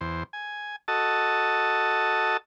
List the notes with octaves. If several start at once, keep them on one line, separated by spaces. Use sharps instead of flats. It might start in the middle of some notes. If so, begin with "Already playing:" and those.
E2 C5
G#5
F#4 A4 D#5 A5